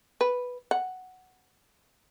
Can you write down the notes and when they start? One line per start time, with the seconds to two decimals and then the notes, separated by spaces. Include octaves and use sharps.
0.21 B4
0.71 F#5